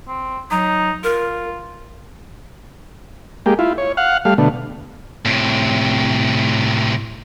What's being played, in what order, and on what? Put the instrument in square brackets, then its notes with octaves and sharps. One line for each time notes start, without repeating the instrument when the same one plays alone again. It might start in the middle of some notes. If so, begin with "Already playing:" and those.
[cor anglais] C4
[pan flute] F#3 [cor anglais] D#4
[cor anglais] F4 [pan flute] A#4
[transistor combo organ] G#3 A#3 G4
E4 F4
C#5
F5 F#5
G3 A3 F5
B2 D3 A3
[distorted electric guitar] A2 C3